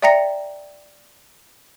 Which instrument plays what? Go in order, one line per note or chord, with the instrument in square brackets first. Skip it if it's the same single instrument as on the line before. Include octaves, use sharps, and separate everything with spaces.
[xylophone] D5 E5 G5 A#5 A#6 C#7